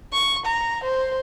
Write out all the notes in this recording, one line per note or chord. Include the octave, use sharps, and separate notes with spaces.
C#6
A#5
C5